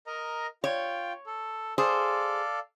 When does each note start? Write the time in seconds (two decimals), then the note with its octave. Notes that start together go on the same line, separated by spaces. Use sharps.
0.07 A#4 D#5 A#5
0.64 F4 C#5 G5
1.27 A4
1.78 G#4 A4 C5 D5 F5